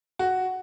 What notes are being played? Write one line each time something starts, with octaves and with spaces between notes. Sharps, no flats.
F#4